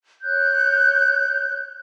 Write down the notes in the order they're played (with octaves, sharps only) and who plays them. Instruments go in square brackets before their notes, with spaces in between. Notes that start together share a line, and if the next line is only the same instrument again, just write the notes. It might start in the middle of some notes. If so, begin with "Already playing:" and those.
[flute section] C#5 F#6 G6